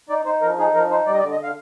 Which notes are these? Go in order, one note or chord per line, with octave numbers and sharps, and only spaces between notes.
D#4 D5
D#4 C5
F3 A#4
D#4 G#4
F3 A#4
D#4 C5
G3 D5
D#5
D5
D3
D#5
D3 F5